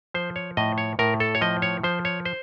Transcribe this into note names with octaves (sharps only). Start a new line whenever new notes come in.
F3 C5
C#5
A2 D#5
C#5
A2 A#4
A4
C#5
F3 D#5
C#5
F3 C5
C#5
C5